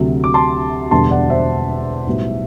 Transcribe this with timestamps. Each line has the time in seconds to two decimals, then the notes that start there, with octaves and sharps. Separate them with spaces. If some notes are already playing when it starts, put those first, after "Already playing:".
Already playing: D2 C3 F#3 A3
0.24 D6
0.34 A5 C6
0.91 E1 E2 D3 G3 A5 C6
1.11 D5 F#5
1.30 C5 E5
2.06 B1 A2 G3 B3 E4